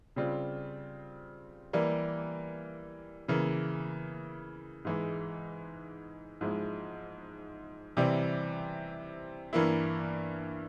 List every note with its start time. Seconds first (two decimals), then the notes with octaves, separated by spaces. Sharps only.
0.16 C#3 G3 C4 F4
1.73 E3 G3 A#3
3.28 C#3 E3 A#3
4.85 G#2 E3 G#3
6.41 G#2 F3 G#3 E4
7.97 C3 E3 G3 C4
9.53 G2 E3 A#3 E4